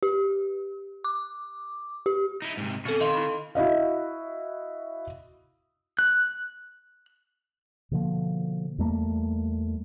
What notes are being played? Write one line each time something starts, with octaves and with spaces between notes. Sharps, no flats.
G4
D6
G4
D#4 E4
G#2 C3
B2 C4 C#4 A4
D#3 D#5 F5 C6
E4 B5
E4 F#4 D#5 F5
F#6
B2 D3 F3 A#3
E2 G3 A3 A#3